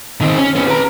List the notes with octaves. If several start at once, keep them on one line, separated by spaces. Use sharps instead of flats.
D#3 C4
C#4
B3 C#4
B4 A#5